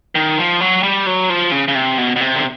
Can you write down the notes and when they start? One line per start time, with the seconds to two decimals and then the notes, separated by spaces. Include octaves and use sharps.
0.15 D#3
0.38 F3
0.61 F#3
0.83 G3
1.06 F#3
1.29 F3
1.52 C#3
1.68 C#3
1.75 C3
1.98 B2
2.16 B2
2.21 C3
2.36 D3